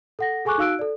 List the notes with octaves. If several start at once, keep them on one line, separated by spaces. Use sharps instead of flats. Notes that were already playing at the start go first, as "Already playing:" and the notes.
A4 F#5 A#6
G#4 A4 G#5 C#6 D6 F#6
D#4 F#4 F5 E6 F#6 D7
A4 D5